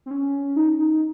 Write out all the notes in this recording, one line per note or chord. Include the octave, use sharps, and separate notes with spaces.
C4
C#4
D#4
D#4